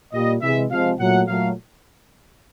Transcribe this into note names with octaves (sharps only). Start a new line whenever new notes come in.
A#2 G3 A#3 D#5
C3 E3 G#3 E5
C3 F3 G#3 F5
A#2 F#3 A3 F#5
A#2 F#3 A3 F5